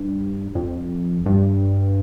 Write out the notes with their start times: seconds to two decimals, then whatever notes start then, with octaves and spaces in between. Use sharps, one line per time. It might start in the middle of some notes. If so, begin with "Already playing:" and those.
Already playing: G2
0.55 F2
1.26 G2